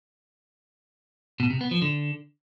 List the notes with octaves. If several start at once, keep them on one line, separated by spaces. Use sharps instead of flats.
B2
C3
B3
F3
D3